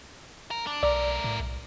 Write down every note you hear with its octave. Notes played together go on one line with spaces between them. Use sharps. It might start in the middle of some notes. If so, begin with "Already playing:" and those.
A#4
D4
B1 A3 A#4 D5
A2
B1